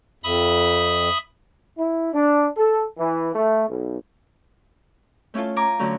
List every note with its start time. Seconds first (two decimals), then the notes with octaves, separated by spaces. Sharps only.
0.24 F2 E5 B5 D#6
1.77 E4
2.13 D4
2.57 A4
2.98 E3
3.35 A3
3.69 B1
5.34 A3 C#4 E4 F4 A4
5.56 G#5 A#5 D6
5.79 D3 F#3 A3 C#4